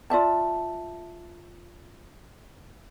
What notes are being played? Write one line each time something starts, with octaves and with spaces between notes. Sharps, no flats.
F4 D5 E5 A5